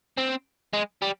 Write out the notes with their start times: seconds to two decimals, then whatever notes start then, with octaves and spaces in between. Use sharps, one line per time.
0.18 C4
0.73 G#3
1.02 G3